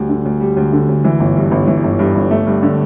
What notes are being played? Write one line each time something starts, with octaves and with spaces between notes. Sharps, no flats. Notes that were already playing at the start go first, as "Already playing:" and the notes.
Already playing: D2 G3
D3
D2
G3
D2
D3
D2
E3
G1
G2
G1
E3
G1
G2
G1
A3
G2
D3